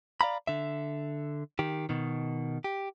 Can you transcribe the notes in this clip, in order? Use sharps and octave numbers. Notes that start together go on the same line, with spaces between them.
D5 F5 A#5 B5
D3 E5
D#3 G4
B2 D#3
G4